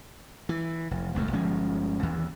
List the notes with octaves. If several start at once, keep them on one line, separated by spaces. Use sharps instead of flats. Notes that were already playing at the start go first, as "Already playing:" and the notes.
E3
F1
D#1 C#2 F#2 A3
G1 F3 G#3 C#4
D#2 E3